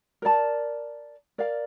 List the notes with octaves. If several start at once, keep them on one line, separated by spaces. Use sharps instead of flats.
A#4 D5 A5
A#4 D5 F5